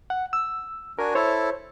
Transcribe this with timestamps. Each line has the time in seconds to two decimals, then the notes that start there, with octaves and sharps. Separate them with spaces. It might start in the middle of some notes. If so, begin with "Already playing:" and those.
0.10 F#5
0.33 E6
0.99 D4 F#4 A#4 G#5
1.15 E4 A4 C5 C#5